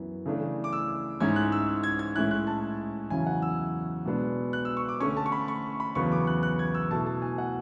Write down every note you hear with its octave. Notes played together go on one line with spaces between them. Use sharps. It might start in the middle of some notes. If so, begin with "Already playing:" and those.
Already playing: F#2 E3 B3
C#3 E3 A3 D4
D6
E6
G#2 G#3 C#4 E4 G#6
F#6
E6
G#6
G#6
A2 G#3 C#4 E4 F#6
F#6
A5
E2 C#3 F#3 C#4 E4 G#5
F#5
E6
B2 G#3 B3 D4
F#6
E6
C#6
D6
D3 A3 C#4 C#6
A5
C#6
B5
C#6
B5
E2 C#3 F#3 B3 C#6
D6
F#6
F#6
G#6
E6
B2 A3 E4 A5
A5
G#5
F#5